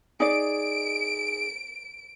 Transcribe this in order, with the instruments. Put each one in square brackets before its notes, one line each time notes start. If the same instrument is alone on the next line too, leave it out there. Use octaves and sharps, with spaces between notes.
[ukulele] D#4 D5 [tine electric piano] G#4 [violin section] D7